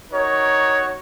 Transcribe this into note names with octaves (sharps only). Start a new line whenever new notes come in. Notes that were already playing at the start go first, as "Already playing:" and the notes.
D#4 F#4 A#4 C#5